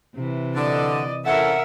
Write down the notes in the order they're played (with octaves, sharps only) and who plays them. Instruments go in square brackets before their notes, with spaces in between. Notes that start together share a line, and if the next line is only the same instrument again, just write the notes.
[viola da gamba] C3 E3
[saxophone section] D3 [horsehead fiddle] D5 D#5
[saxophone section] E3 C#4 A4 [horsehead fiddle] A#4 E5 [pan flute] F#5